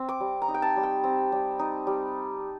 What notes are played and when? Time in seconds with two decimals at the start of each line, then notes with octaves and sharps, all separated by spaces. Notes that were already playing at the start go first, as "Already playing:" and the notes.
Already playing: C4
0.09 D6
0.20 G3
0.42 A#5
0.48 D#4
0.54 G5
0.62 A5
0.77 G3
0.83 G5
1.04 C4
1.32 G3
1.59 D#4
1.87 G3